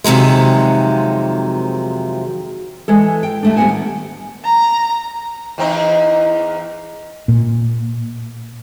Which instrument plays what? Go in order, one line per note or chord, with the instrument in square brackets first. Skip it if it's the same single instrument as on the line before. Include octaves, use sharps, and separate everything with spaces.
[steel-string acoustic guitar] F2 C3 D#3 F#3 G#3
[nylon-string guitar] E3 G#3 A4
G5
D#2 A3 D4
D2 G3 B3 C5 F#5 G#5
D#3
[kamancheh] A#5
[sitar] E2 C4 D#4
[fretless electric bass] A#2